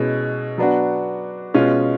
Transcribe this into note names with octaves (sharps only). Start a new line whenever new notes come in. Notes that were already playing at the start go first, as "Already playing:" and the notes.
Already playing: B2 G#3 C#4 E4 G#4
F#3 B3 D4 F#4
B2 G#3 C#4 F4